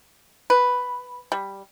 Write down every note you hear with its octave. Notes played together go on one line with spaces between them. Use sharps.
B4
G3